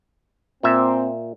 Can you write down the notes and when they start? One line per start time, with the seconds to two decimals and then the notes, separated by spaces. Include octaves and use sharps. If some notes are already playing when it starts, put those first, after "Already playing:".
0.63 A#2 C4 E5